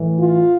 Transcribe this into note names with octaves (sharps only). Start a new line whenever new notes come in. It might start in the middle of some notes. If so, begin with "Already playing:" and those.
Already playing: A2 E3
F4